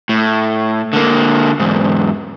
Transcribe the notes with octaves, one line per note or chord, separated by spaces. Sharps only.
A2
D3 A#3
E2 G#2